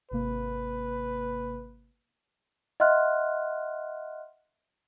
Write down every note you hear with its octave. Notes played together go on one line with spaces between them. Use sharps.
G#1 C3 A#3 B4
D#5 E5 F#5 C6 F6 F#6